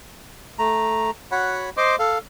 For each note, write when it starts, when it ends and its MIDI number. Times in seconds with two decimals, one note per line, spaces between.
0.59 1.11 57
0.59 1.11 82
1.32 1.70 66
1.32 1.70 73
1.32 1.70 78
1.32 1.70 83
1.77 1.96 72
1.77 1.96 75
1.77 1.96 84
1.77 1.96 86
1.99 2.18 69
1.99 2.18 77